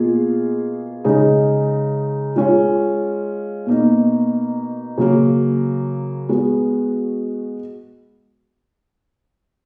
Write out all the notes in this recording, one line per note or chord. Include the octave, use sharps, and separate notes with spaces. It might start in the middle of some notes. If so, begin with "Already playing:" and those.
Already playing: B2 A#3 F4 G#4
C#3 G#3 D#4
G#3 C#4 F4
B2 A#3 D#4
C#3 F#3 A#3
G#3 B3 F#4